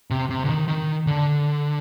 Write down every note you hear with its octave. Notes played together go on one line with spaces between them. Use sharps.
C3
C3
D3
D#3
D#3
D3